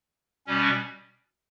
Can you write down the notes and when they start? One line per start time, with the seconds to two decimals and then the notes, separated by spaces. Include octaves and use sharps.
0.47 B2 G3 C#4